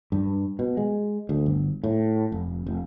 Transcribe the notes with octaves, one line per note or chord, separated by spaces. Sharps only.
G2
B2
G#3
D2
G1
A2
F1
F1